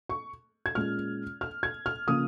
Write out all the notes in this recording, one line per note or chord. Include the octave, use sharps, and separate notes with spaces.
C#6
G#6
A#2 G#3 C#4 F6
F6
G#6
F6
C#3 F3 A#3 D#6